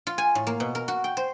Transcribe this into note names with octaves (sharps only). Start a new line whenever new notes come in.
F4
G#5
A2
A#3
B2
A#4
F#4
G5
C5